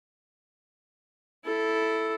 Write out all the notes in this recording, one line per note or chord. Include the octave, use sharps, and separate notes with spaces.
E4 A4